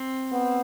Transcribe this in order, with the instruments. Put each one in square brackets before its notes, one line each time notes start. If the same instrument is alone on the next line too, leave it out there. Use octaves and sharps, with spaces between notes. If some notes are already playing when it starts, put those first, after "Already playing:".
Already playing: [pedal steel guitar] C4
[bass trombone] B3